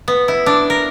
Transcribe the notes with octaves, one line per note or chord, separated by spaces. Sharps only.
B3
E4
D4
A#4